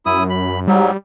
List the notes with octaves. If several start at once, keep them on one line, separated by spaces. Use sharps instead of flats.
F#2 E4 D#6
B5
G#2 F#3 G3